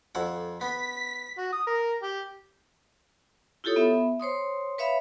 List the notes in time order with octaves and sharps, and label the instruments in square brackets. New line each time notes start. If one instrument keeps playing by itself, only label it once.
[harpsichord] F2 A4 F#5
[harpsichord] B3 [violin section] B6
[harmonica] F#4
D#6
A#4
G4
[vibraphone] E4 F4 G4 A4 C#5 D#6
B3 E5 B5
C5 C#5 C6 D#6
B4 C#5 E5 F5 B5